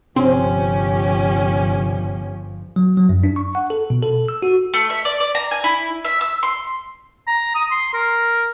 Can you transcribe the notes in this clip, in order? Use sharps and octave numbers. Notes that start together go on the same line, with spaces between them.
G1 C3 F3 C4 C#4 G4
F#3
F#3
F#2
D4
C#6
F#5
A4
B2
A4
E6
F#4
A3
E5
D5
D5
A#5
G#5
E4
E5
E6
C6
A#5
D#6
C6
A#4